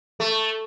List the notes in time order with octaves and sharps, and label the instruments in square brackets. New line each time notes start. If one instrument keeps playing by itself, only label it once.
[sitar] A3